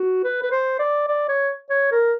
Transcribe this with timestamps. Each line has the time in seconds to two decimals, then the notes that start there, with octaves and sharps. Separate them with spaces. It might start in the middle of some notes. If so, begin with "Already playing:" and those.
Already playing: F#4
0.24 B4
0.42 B4
0.51 C5
0.79 D5
1.08 D5
1.29 C#5
1.70 C#5
1.92 A#4